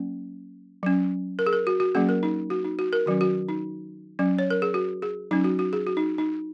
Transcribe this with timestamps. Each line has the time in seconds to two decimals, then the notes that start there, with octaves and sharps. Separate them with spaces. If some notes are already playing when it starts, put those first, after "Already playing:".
Already playing: F#3 A#3 C#4
0.83 F#3 C#4
1.39 A#4
1.46 G#4
1.53 A#4
1.67 F#4
1.80 F#4
1.95 F#3 A#3 C#4 G#4
2.09 A#4
2.23 D#4
2.50 F#4
2.64 D#4
2.79 F#4
2.93 A#4
3.06 D#3 F#3 C#4 F#4
3.21 F#4
3.48 D#4
4.19 F#3 C#4
4.39 C#5
4.50 A#4
4.62 G#4
4.74 F#4
5.02 G#4
5.31 F#3 C#4 D#4
5.44 F#4
5.59 F#4
5.73 G#4
5.87 F#4
5.97 D#4
6.18 D#4